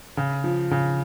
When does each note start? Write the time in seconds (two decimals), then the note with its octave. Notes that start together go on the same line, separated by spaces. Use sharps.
0.17 C#3
0.44 F3
0.71 C#3